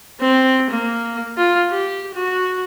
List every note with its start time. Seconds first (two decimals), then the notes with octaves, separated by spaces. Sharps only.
0.21 C4
0.71 A#3
1.37 F4
1.70 G4
2.14 F#4